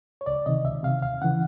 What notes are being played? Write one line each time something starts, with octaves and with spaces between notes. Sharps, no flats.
C#5
C#2 D5
C3 D#3 D#5
C#2 E5
C3 D#3 F5
D#2 F5
C#3 E3 F#5